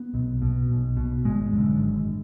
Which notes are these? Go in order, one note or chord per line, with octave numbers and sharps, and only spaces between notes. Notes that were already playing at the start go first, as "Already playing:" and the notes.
Already playing: B3
B1
B2
B1
B2
G#1 G#3
F#2 D3
G#1